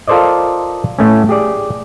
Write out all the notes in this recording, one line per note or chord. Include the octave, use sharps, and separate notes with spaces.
F4 A4 A#4 C5 D5 D#5
A2 A3 C#4
G4 G#4 D5